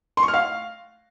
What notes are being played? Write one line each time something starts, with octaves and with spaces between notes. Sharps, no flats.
C6
C#6
F6
F5